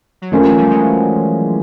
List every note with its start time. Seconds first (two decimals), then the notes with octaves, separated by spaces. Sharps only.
0.22 F#3
0.31 D#3 F3 A3 C#4 F4 A#4
0.45 E3 F#3
0.58 F3 G3
0.71 F#3 G#3